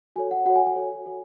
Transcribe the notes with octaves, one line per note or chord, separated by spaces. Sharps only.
F#4 A4 C#5 G#5
F#5
F#4 A4 C#5 F#5
G#5
G#5
F#4 A4 C#5
F#4 A4 C#5